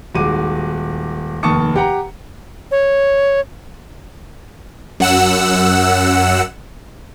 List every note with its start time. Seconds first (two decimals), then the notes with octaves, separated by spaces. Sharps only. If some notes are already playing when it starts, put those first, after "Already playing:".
0.15 D#1 G#3 F#4 D6 D#7
1.43 F1 D#2 A5 C#6 D#6 C#7
1.76 G4 F#5 A#5
2.71 C#5
5.00 F#2 F#5 E6